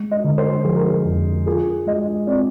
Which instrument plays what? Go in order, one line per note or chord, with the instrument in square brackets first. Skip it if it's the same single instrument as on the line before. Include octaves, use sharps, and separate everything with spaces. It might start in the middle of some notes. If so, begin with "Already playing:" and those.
Already playing: [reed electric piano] G#3
[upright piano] D#5
[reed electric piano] D3
[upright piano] C5
[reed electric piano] F3 [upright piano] G#4
[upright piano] A#4
G#4
[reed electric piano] F2
[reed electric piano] F4 [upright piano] G#4
[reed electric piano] G#3 [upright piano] D#5
[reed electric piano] C4 [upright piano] D5